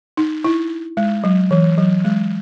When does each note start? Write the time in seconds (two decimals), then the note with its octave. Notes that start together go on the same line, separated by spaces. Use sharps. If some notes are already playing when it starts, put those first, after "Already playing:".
0.17 D#4
0.44 E4
0.97 G#3
1.24 F#3
1.51 E3
1.78 F#3
2.05 G#3